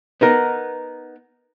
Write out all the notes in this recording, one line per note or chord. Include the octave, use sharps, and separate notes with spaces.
B3 D#4 A#4